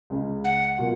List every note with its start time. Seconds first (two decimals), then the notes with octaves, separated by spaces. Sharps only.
0.10 C#2 C#3 G#3
0.44 F#5
0.78 B2 F#3 A#3 F4